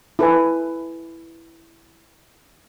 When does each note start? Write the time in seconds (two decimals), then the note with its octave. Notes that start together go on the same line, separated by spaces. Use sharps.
0.19 E4 A4 B4 G#5